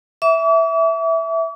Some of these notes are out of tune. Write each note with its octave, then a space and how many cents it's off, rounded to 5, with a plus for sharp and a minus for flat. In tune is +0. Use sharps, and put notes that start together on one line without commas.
E5 -5 D6 -45